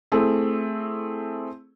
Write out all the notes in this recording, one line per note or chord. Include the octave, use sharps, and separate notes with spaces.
A3 C4 E4 G#4